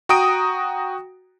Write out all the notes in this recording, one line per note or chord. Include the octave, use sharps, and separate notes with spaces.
F#4 G5 A#5 D#6 D7